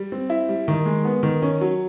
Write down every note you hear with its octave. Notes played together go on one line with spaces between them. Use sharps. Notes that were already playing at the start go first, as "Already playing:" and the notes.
Already playing: G3
C4
E4
G3
D#3
G#3
B3
D#3
C#4
F#3